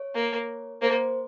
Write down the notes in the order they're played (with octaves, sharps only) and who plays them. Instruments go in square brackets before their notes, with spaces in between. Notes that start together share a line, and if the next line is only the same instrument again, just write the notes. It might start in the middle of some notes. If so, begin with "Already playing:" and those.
Already playing: [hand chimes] C#5
[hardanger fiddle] A#3
[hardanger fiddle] A#3 [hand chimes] C5